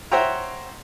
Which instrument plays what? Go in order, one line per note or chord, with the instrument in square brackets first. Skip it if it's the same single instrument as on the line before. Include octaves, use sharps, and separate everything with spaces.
[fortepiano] C5 C#5 E5 F#5 G5 A#5